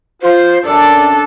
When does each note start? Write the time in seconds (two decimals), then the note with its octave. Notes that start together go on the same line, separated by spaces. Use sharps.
0.22 F4 C5
0.65 F#2 D4 A4 D5